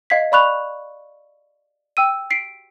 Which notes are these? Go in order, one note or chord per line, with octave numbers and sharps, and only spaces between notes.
D#5 F5 G#6 B6
D5 F5 B5 C#6 F#6 F7
G5 E6 D#7
B6 C7 D7